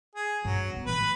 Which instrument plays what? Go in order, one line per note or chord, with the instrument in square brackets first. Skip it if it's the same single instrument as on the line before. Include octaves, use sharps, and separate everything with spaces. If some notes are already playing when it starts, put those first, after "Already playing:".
[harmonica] G#4
[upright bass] G2 [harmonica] F#3
[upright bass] C3 B3
[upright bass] A2 E3 [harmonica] B4